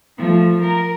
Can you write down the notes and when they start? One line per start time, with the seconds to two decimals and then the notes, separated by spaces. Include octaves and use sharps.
0.18 F3 A3
0.62 A#4